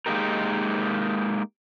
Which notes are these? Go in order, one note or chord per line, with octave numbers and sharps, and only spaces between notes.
G#3 A#3 D#4 G4 A#4